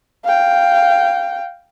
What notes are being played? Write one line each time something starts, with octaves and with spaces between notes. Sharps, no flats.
F5 G5